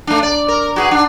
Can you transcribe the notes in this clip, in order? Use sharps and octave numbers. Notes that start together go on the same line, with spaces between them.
A3 D4
D5
A#4
F#4 G#4 B4
D4